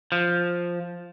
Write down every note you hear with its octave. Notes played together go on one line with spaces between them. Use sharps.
F3